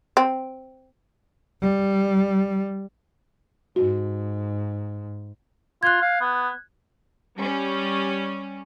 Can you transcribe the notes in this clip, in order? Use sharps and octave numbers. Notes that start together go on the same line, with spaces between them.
C4
G3
G#2 F#4
F4 F#6 G#6
F5
B3
G3 C#4